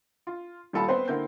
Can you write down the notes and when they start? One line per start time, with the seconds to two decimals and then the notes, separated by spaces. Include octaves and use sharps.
0.27 F4
0.73 D#1 G3 F4 A4 F5 B5
0.88 B3 C4 B4 C5
1.08 D3 A#3 C4 E4 G6